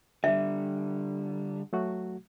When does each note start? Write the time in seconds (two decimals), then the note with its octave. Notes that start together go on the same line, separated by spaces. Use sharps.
0.24 D3 G3 E5
1.73 F#3 A3 F#4